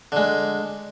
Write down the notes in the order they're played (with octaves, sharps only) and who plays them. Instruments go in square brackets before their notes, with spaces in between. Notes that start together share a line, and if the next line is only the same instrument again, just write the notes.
[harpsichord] D3 G#3